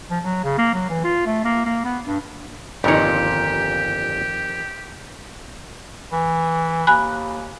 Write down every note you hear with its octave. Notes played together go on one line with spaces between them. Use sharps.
F3
F#3
C#3
A#3
F#3
E3
F4
A3
A#3
A#3
B3
G2
G1 F2 A#2 D#3 G4 C#5
E3
D#2 G#5 B5 F#6